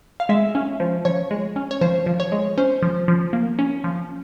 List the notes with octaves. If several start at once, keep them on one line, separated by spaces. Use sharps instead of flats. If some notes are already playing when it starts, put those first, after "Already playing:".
F5
G#3 E5
C#4
F3
F3 C#5
G#3
C#4
C#5
F3 C5
F3
C#5
G#3
C#4 C5
F3
F3
A#3
C#4
F3